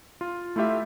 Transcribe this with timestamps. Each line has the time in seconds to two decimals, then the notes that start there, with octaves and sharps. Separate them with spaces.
0.21 F4
0.56 A3 E4 F4 G4 E5